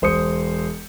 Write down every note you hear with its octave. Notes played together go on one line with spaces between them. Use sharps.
E1 C5 D#6 C#7